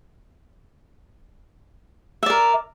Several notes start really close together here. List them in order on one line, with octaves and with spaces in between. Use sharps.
E5 D5 A#4